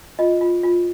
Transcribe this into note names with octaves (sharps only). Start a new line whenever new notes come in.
F4 D#5
F4
F4